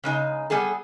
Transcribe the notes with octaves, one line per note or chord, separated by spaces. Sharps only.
C#3 G#3 D#4
G3 B3 G#4 A4